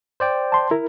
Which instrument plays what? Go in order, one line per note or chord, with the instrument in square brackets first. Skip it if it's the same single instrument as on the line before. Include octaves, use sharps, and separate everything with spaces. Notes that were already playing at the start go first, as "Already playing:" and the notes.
[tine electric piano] C5 D5 G5
[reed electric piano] A5 C6
E4 A#4